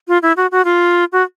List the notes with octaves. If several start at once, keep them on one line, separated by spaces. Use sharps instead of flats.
F4
E4
F#4
F#4
F4
F#4